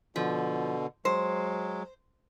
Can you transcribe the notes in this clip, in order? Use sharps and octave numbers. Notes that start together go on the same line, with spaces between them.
B2 D3 F3
F#3 G#3 C5